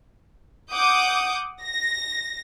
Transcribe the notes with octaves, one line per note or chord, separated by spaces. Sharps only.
F#5 D6 D#6 G6
A#6